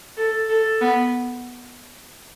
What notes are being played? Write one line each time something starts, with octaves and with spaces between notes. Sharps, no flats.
A4
A4
B3